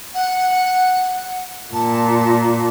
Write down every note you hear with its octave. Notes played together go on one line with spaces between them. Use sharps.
F#5
A#2 A5